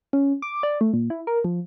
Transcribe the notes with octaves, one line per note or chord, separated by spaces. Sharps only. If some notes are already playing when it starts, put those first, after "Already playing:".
C#4
D6
D5
A3
A#2
E4
A#4
F3